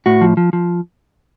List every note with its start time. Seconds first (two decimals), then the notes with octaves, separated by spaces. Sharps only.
0.06 A2 F#4
0.21 F3
0.37 F3
0.53 F3